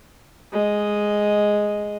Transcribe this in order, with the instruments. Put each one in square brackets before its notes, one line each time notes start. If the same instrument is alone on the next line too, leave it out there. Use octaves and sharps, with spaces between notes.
[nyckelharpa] G#3 D#5